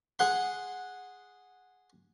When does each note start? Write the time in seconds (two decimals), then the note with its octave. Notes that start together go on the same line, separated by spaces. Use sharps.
0.19 G#4 F#5 C6